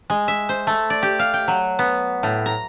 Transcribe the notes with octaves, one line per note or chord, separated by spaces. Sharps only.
G#3
E5
C5
A3
D5
G4
F5
G5
F#3
B3
A2
A#5